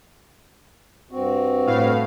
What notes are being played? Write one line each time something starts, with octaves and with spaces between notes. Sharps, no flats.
G2 C4 F#4
A2 F5